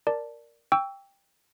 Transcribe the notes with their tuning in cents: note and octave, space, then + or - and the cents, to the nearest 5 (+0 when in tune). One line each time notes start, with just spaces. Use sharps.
A#4 +0 D5 +0 A5 +0
G5 +15 C#6 +35 E6 +0